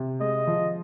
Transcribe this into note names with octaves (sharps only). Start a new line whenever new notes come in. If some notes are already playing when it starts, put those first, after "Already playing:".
Already playing: C3
G#3 D#5
F3